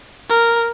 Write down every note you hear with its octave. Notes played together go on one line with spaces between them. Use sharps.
A#4